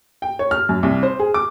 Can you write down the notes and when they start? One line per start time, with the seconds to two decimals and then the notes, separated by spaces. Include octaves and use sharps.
0.22 G5
0.39 C#5
0.51 F6
0.69 F#2
0.83 C2
1.03 C5
1.19 G#4
1.34 D6